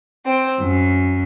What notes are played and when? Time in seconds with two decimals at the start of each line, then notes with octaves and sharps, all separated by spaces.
0.25 C4
0.61 F#2